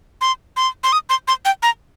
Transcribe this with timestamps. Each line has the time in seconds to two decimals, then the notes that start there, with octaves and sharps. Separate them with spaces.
0.21 C6
0.57 C6
0.84 C6
0.92 D#6
1.10 C6
1.28 C6
1.45 G5
1.63 A#5